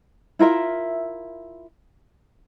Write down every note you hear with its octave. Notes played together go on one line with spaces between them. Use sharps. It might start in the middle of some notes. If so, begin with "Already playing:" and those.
E4 F4 A#4 E5